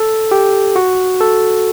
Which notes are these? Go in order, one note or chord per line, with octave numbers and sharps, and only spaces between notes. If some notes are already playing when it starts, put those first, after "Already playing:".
Already playing: A4
G4
F#4
A4